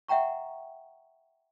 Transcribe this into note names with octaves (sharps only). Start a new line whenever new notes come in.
E5 F#5 G5 A#5 C#6